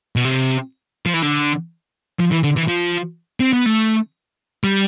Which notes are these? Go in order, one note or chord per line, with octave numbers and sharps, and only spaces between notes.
B2
C3
F3
E3
D3
F3
E3
D3
E3
F3
C4
B3
A3
G3